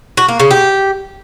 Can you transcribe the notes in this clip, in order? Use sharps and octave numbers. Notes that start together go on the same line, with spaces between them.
F#4
A#3
C#3
G4